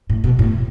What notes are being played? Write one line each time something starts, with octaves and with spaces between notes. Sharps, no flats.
A2
B2
A2